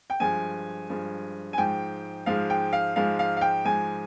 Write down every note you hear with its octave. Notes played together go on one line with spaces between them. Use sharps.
G5
G2 F3 G#3 G#5
G2 F3 G#3
G#5
G#2 F3 G#3 G5
G#2 F3 G#3 F5
G5
F5
G#2 F3 G#3 F5
F5
F5
G5
G#2 F3 G#3 G#5